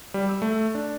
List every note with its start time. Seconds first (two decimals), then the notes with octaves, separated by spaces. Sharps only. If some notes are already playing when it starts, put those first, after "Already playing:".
0.14 G3
0.29 E6
0.42 A3
0.75 D4